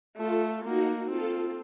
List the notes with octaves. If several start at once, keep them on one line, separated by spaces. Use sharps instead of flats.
A3 F4 A4
A#3 D#4 F#4
C4 F4 A4